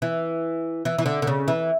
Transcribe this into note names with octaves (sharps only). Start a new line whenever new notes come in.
E3
E3
E3
D3
D3
C#3
E3